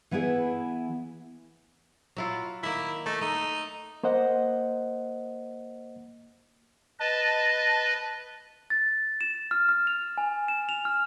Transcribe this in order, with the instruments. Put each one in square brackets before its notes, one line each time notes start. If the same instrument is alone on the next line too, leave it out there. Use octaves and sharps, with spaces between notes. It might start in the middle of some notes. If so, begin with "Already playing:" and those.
[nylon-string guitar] E3 B3 E4 G#4 E5
[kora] F#3 E4 F4
[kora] D#3 A#3 [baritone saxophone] E4
[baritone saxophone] A3 [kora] D#4
[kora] A3 [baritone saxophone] D#4
[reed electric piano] A#3 C5 D#5 F#5
[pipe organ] B4 D#5 [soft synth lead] A5
[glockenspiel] A6
E7
F6
F6
F7
G#5
E7
F7
F6